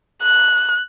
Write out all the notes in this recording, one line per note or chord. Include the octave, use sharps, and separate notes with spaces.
F#6